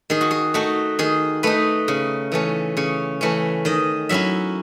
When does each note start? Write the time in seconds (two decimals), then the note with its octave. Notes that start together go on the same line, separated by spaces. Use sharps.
0.10 D#3 G#4
0.21 F#4
0.31 G#4
0.54 A3 D#4 F#4
0.99 D#3 G#4
1.43 A3 D#4 B4
1.88 C#3
2.32 E3 A3 C#4
2.77 C#3 C#5
3.21 E3 A3 C#4
3.65 D#3 D#5
4.09 F#3 C#4 E4 E5